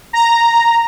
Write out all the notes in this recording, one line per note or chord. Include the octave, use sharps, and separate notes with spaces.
A#5